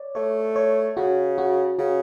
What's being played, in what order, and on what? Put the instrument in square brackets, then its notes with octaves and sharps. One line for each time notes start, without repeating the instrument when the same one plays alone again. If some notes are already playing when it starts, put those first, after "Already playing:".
Already playing: [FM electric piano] C#5 D5
[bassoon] A3 [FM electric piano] C#5
[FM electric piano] C#5
[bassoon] C#3 [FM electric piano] F#4
[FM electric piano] F#4
[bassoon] C#3 [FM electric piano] F#4